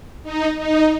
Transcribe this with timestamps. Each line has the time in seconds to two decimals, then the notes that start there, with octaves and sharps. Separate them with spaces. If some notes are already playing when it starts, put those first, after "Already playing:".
0.23 D#4
0.58 D#4